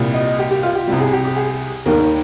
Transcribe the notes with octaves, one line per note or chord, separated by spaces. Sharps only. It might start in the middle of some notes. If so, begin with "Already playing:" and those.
Already playing: C2 A#2 G3
D#5
G4
G4
F4
G4
C2 C3 G3
G#4
G4
G4
G#4
D#2 D#3 G3 A#4